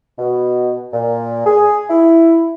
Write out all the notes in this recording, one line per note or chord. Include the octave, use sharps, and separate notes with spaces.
B2
A#2
G#4
E4